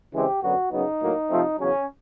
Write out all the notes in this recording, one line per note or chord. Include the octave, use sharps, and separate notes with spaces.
C#3 E3 G#3 C4 G4
F#2 D3 F#3 B3 F#4
F#2 C#3 F#3 B3 D#4
A2 F#3 A#3
C3 F3 A3 C4
E2 C#3 F#3 C#4